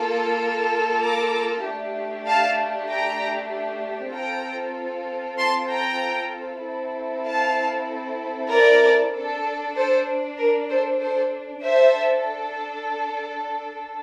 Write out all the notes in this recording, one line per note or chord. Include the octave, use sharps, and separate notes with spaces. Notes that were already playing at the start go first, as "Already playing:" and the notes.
Already playing: A#3 F4 A4
A#5 D6
A3 D4 G4
F5 A5
G5 A#5
C4 F4 A4 G5 A#5
A5 C6
G5 A#5
C4 E4 A4
F5 A5
A#4 D5
D4 A4
A4 C5
A#4
A4 C5
A4 C5
D4 A4 C5 E5